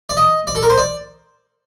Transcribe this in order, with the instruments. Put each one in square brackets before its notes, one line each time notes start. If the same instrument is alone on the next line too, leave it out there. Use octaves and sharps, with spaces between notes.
[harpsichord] D5
D#5
D5
A4
A#4
C5
D5